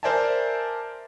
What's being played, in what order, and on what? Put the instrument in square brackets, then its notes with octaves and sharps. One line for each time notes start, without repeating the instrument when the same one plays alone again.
[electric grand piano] A#4 C5 D5 E5 G#5 A5